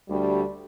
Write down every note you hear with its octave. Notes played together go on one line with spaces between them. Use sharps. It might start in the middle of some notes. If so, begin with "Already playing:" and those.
D2 D3 G3